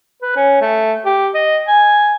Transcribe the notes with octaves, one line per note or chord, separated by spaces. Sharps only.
B4
C#4
A3
G4
D#5
G#5